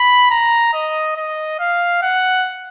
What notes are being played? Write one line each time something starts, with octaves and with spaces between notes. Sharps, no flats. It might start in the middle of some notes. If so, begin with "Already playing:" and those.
Already playing: B5
A#5
D#5
D#5
F5
F#5